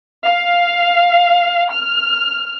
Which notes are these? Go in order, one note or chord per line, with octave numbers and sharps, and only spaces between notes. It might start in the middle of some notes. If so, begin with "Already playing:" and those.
F5
F6